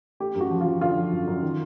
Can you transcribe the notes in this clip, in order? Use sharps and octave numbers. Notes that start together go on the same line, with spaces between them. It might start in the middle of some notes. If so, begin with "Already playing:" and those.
A3 G4
F#2
F#4
F3
F4
F3
D3 F4
F3
F#2
F#2
D#3